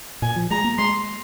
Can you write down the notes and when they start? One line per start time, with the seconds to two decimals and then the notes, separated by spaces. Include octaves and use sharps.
0.22 A#2 G#5
0.36 F3
0.51 G#3 A#5
0.64 A#3
0.78 G#3 C6